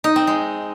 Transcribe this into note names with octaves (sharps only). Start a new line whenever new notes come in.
D#4
C4
G#3